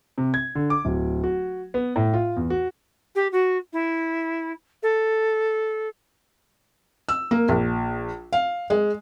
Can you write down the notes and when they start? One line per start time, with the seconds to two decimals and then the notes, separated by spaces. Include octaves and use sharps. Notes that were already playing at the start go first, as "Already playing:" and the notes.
0.18 C3
0.34 G#6
0.55 D3
0.70 D6
0.85 D1
1.24 F#4
1.74 B3
1.96 A2
2.13 F4
2.36 E2
2.50 F#4
3.15 G4
3.32 F#4
3.73 E4
4.83 A4
7.09 E6
7.31 A#3
7.49 A#1
8.33 F5
8.70 G#3